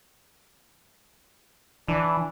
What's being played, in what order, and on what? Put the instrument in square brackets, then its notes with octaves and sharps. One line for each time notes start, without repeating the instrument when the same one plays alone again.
[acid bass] E3 [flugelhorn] D4